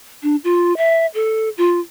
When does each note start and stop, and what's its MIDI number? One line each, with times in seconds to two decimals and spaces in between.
0.23 0.36 62
0.44 0.76 65
0.77 1.06 76
1.14 1.49 69
1.58 1.80 65